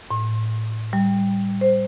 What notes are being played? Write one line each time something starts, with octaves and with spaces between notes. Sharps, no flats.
A2
G3
C5